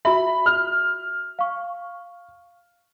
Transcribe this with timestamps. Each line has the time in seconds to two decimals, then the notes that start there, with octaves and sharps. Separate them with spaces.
0.05 F#4 E5 B5
0.46 F6
1.39 F5 C#6